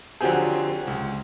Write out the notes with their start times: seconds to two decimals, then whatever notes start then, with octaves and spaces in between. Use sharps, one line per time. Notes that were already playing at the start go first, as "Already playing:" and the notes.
0.21 D3 F3 F#3 C4 G4 G#4
0.87 C#2